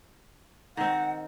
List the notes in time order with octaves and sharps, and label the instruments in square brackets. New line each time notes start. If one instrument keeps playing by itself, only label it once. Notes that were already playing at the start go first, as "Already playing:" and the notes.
[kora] D#3 C4 [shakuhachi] F#5